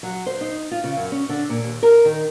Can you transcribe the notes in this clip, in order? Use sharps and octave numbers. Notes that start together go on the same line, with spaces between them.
F#3
C5
D#4
F4
C#3
F#2
C#4
D3
A#2
D#2
A#4
D#3